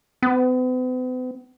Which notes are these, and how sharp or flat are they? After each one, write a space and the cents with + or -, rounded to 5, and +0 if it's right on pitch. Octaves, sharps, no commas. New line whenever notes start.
B3 +45